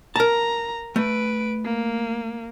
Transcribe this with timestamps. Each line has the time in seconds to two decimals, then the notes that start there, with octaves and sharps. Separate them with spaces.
0.16 A#4 A5 A#5
0.96 A3 B4 D7
1.65 A#3